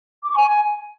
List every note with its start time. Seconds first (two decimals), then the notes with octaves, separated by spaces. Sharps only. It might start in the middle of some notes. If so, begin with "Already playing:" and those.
0.24 D6
0.31 C#6
0.38 G#5